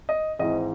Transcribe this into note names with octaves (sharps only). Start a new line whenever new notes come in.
D#5
G#1 G#2 E3 D#5